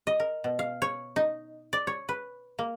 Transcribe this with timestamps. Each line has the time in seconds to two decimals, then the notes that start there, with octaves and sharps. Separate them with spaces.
0.07 D#5
0.20 A#4
0.44 B2
0.59 F5
0.82 C#5
1.16 D#4
1.73 D5
1.87 C#5
2.09 B4
2.59 A#3